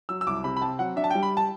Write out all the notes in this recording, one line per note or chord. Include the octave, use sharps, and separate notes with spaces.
F#3 E6
E6
C2 D6
C3 B5
B5
C4 A5
F#3 F#5
D4 E5
A5
G5
G3
B5
A5